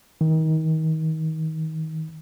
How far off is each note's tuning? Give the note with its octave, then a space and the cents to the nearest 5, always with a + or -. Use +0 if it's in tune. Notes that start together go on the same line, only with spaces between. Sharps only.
D#3 +30